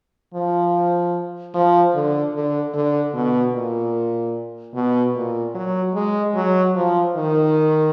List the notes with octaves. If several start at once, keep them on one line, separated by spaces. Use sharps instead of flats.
F3
F3
D3
D3
D3
B2
A#2
B2
A#2
F#3
G#3
F#3
F3
D#3